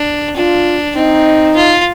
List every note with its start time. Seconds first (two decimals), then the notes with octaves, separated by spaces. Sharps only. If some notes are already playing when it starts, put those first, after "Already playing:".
Already playing: D4
0.35 D4 F4
0.95 C4 D#4
1.56 F4